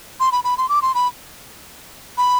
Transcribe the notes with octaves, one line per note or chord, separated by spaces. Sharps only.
C6
B5
B5
C6
D6
C6
B5
B5